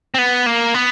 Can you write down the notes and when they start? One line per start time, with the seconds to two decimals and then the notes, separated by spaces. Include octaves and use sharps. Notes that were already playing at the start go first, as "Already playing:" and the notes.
0.14 C4
0.18 B3
0.46 A#3
0.74 B3